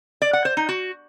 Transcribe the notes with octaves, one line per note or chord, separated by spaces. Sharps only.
D5
F#5
C5
D#4
F#4